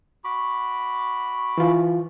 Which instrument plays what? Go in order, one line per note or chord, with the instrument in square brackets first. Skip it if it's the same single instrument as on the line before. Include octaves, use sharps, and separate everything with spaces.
[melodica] F#4 B5 D6
[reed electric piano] E3 F4